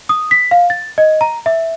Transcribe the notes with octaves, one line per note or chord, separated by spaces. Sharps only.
D#6
B6
F5
A6
D#5
A#5
E5